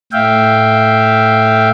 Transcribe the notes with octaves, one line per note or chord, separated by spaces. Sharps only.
A2 E5 F5 G5